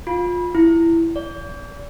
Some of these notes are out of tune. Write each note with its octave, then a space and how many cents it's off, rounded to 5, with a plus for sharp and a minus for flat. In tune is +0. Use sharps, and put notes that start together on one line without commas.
F4 +20
E4 +10
D5 -40